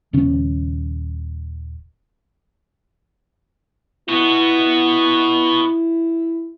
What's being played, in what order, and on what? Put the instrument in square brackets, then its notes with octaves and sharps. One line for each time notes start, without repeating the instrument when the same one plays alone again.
[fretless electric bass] D#1 C#3 C#4
[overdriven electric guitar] B3 F#4 [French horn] E4